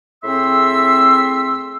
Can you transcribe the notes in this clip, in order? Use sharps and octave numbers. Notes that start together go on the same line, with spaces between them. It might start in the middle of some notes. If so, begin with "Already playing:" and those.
A2 C4 G#4 E5 C6 E6